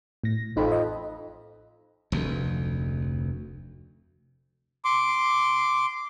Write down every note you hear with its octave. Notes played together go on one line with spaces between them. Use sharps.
A2 A#6
A1 F2 D#4 B5
D#5
F1 D2
C6 D6